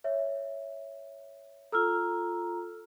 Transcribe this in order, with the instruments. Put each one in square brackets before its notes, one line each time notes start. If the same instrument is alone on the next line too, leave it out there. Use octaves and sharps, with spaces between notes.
[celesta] C#5 E5
[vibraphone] F4 A#5 [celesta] A4 E6 F6